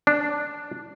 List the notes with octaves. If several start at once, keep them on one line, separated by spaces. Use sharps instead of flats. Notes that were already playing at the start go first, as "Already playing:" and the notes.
D4